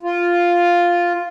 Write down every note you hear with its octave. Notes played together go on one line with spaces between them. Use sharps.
F4